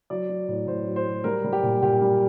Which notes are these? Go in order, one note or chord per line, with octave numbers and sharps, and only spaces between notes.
F#3 D5
F#3
A2
A2 C5
F#3
C5
F#3
G3 A#4
G3
G4
A#2
A#2 G4
G3